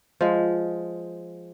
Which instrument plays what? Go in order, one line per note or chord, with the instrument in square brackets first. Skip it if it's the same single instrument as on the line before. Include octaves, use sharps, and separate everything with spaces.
[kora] F3 G#3